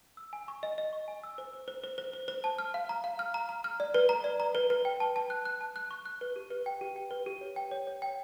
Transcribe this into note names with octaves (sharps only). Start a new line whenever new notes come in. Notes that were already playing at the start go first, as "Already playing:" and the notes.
E6
G#5
C#6
D#5
D#5
C#6
G#5
E6
C5
C5
C5
C5
C5
C5
C5
A5
F6
F5
A#5
F5
F6
A#5
A#5
F6
D5
B4
A#5
D5
A#5
B4
B4
G5
A5
A5
F#6
F#6
A5
F#6
C#6
F#6
B4
G4
B4
G5
G4
G5
B4
G4
C#5
G5
C#5
C#5
G5